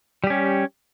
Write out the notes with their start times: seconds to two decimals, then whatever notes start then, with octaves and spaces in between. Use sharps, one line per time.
0.24 G3
0.27 G4
0.30 C#4